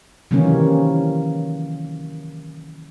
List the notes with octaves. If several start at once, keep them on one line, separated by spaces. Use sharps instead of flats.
C3 D#3 E3 F#3 A#3 C#4